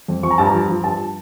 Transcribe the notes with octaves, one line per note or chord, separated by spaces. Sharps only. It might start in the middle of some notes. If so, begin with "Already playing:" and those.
F2
F3 C#6
A#5
G2 A5
A#5
F3
F3
G2 A5